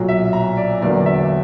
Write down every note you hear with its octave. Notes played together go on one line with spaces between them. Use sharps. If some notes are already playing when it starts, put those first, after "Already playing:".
Already playing: B1 A#2 F#3
E5
A#5
D5
E2 D3 F#3 A#3 D5
E5